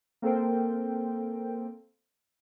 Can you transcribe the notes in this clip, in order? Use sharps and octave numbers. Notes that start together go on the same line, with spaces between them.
A#3 C4 A4 A#4 C5 G5